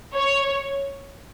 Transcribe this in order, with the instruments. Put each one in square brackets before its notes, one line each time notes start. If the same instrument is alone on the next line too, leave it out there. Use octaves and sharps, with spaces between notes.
[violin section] C#5